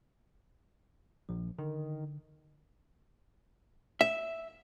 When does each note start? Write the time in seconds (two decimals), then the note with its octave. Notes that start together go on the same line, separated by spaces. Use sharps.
1.29 A#1 F3
1.59 D3 D#3
4.01 E5